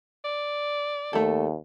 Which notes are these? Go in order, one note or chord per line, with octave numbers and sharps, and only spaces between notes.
D5
D#2 A3 A4